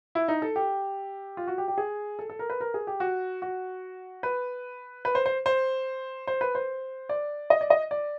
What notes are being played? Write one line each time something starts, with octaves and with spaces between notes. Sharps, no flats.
E4
D#4
A4
G4
F4
F#4
G4
G4
G#4
A4
A4
A#4
B4
A#4
G#4
G4
F#4
F#4
B4
B4
C5
C5
C5
C5
B4
C5
D5
D#5
D5
D#5
D5